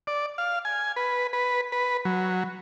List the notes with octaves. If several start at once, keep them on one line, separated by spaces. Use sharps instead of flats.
D5
F5
G#5
B4
B4
B4
F#3